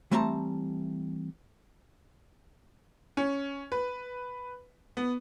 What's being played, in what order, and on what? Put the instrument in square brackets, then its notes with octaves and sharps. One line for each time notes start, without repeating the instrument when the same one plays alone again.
[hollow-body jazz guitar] E3 G3 A3 C4 A5 A#5
[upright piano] C#4
B4
B3